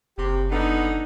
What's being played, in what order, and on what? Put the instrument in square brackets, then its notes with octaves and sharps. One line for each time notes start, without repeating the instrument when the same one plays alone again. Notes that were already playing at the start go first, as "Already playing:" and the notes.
[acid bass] F#1 [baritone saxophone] C3 [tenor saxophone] G4
[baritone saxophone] D3 [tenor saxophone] B3 [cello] D#4